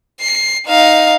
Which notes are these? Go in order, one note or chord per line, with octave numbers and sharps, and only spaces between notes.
C7
D#4 F5